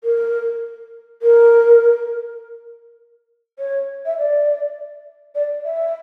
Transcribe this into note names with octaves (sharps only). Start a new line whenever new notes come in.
A#4
A#4
C#5
E5
D5
D5
E5